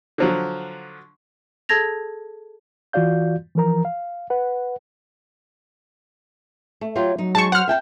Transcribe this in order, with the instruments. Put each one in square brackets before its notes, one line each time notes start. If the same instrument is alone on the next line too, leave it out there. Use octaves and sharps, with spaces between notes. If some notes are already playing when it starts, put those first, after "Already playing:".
[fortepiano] D3 F3 F#3
[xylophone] G#4 A4 A5 G#6 A#6 F7
[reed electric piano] E3 F4 F#4 D5 F5 G6
E3 F3 A#4 A#5
F5
B4 F#5
[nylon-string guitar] A3
[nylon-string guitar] F#3 F4 G4 [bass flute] C#5
[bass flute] F#3 [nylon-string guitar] D#4
[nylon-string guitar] G#3 D#4 [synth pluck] A5 C#6
[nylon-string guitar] C5 [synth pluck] F#5 F6
[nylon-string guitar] E5 G5 A5